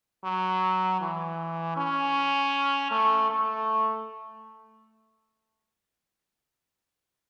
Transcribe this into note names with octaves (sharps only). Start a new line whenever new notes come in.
F#3
E3
C#4
A3
A3